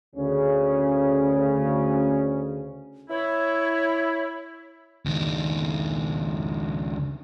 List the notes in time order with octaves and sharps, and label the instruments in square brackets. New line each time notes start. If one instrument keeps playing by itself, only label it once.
[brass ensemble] D2 C#3 C#4
[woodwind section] E4 [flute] C#5
[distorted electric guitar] C#2 D#3